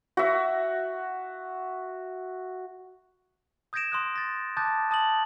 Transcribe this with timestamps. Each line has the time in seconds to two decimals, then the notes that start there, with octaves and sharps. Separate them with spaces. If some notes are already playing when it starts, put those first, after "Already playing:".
0.17 F#4 E5
3.73 D#6 G6 G#6 A#6 D7 E7
3.92 C6 D#6 F#6
4.16 A6 A#6
4.57 A5 D6 D#6 F#6 G6 A6
4.91 A5 D#6 A6 F#7